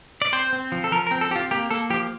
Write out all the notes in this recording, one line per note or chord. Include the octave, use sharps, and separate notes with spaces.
D5
C4 C5
C4
F3
A4
F3 A#4
A#4
C4
A4
C4 F4 G4
A#3 G4
A#3 A4
F3 G4